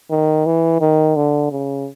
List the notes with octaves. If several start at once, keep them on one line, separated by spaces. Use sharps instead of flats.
D#3
E3
D#3
D3
C#3